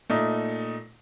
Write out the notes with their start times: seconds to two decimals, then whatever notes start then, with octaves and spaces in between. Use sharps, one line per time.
0.10 A#2 A3 D#4